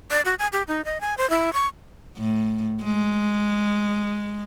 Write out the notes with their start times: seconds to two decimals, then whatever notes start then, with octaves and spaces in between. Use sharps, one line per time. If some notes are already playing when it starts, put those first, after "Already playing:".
0.11 D5
0.25 F#4
0.39 G#5
0.53 G4
0.68 D#4
0.85 D#5
1.01 G#5
1.18 C5
1.30 E4
1.53 C#6
2.17 A2
2.84 G#3